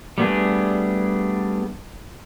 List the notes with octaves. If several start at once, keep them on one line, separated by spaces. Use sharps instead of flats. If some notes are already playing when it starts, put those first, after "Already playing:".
G3 A3 B3 D4 G#4